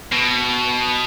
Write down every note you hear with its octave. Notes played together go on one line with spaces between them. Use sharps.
B2